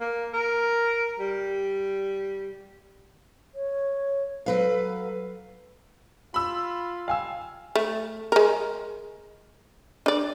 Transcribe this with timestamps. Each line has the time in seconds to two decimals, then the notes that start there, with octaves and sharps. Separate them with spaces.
0.01 A#3
0.33 A#4
1.20 G3
3.55 C#5
4.46 F#3 A4 B4 F5
6.34 F4 B5 E6
7.08 F5 G#5 E6
7.76 A3
8.32 G#3 A#4
10.06 D4 D5